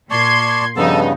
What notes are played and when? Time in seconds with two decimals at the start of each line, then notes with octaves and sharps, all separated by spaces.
0.11 A#2 D5 A5 C6 C#6 G#6
0.76 G2 C#3 F3 B3 D#4 A4 A5